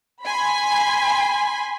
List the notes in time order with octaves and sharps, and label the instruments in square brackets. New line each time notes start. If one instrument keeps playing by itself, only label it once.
[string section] G#5 B5 C6